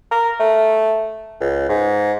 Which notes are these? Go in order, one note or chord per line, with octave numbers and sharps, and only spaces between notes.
A#4
A3
C#2
G#2